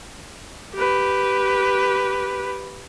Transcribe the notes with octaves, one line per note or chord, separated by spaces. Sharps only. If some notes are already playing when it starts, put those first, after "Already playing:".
G4 B4